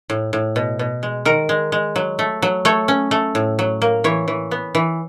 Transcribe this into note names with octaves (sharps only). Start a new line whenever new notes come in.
A2
A2
B2
B2
G#3
D#3 A#4
G#3
G#3
F#3
A3
F#3
A3 C#5
C#4
A3
A2
F#3
A#3
E3 C#5
E3
B3
E3